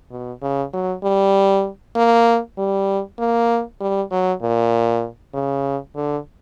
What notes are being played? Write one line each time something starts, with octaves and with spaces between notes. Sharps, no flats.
B2
C#3
F#3
G3
A#3
G3
A#3
G3
F#3
A#2
C#3
D3